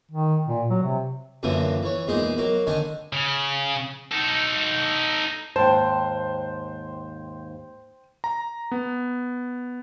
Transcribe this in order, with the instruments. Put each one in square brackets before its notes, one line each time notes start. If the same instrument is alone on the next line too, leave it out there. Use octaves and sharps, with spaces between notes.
[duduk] D#3
A#2
F#3
C3
[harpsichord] F#2 A#2 D3 E3 A#3 D#6
E3 C#5
E2 A#2 G#3 D#4 C6 D#6
F#3 A#3 A#4
D3 D#3 D4 G#5
[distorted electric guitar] C#3
D#4 A4
[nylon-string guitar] D#2 G#2 A5 [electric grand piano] C5 G5
[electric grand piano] A#5
B3